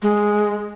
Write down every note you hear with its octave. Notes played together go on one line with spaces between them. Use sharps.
G#3